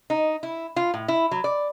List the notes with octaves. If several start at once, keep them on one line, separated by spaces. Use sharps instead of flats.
D#4
E4
F4
A2
E4
F#3
D5